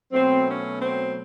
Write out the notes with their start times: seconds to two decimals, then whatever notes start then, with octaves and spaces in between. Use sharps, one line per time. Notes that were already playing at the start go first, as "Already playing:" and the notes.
0.12 B2 F#3 A3 C4
0.46 C#4
0.79 C4